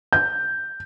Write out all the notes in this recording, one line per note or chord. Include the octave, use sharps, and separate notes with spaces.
G6